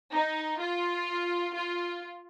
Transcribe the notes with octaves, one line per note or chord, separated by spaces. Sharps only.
D#4
F4
F4